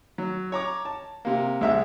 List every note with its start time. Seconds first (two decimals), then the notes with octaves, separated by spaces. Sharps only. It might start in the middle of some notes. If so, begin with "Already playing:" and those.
0.18 F#3
0.52 C#5 A#5 D6
0.85 A5
1.25 C3 A#3
1.61 C2 G#3 E5 E6